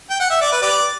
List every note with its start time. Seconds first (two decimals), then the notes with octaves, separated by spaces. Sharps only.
0.10 G5
0.20 F#5
0.31 E5
0.41 D5
0.52 B4
0.62 G4 B4 D5